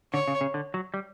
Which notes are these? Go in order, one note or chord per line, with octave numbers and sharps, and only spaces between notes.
D3 C#5
C#3
C#3
D3
F#3
G3